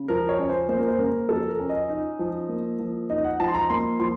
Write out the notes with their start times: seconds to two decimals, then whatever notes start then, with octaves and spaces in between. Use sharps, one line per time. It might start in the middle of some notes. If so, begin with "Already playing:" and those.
Already playing: C#3
0.08 F3 A#4
0.29 C#5
0.39 C#4
0.49 C5
0.69 A#3 C5
0.78 A#4
0.88 C5
0.99 C#3 A#4
1.29 F3 A4
1.49 A#4
1.60 C#4
1.69 D#5
1.89 D#4
2.19 F3
2.49 A#3
2.79 F3
3.10 D#4 D#5
3.24 F#5
3.40 F3 A5
3.48 C6
3.54 A#5
3.70 A#3 C6
4.00 F3 C6